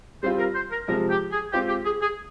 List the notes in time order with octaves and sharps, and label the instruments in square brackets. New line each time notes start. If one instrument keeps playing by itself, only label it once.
[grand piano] G3 C4 F4 [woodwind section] C5
[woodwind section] A#4
C5
A#4
[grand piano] C3 F3 G#3 [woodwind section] A#4
[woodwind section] G4
G#4
[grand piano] G#3 C4 F4 C5 [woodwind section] G4
[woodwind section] G4
G#4
G#4